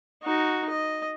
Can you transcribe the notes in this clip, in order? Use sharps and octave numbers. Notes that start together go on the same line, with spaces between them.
D#4 F#4
D#5